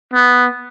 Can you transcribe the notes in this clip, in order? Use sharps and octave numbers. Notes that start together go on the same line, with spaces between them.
B3